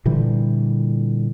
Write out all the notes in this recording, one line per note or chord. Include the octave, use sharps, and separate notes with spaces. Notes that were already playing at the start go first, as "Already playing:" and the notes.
A#2 D3 E3 G3